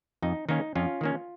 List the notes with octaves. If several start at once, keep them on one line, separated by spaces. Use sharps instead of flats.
F2 D#4
D#3 A#3 C#4 D#4
F2 C#4 F4
D#3 A#3 C#4